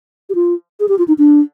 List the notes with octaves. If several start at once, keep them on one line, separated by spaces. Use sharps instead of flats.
G4
F4
G#4
G4
F4
D#4
D4